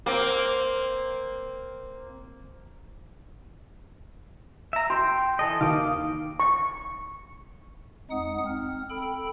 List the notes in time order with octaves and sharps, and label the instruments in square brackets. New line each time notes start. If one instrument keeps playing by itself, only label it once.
[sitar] A#3 C4
[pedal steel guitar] E5 A#5
[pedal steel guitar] G5 [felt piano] C6
[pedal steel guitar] E3 A4 D#5
[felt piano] D#2 [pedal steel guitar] F5 D6 D#6
[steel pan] C#6
[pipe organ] F2 G#3 D#4 F#5 D#6
C4 F6
A4 G5 B5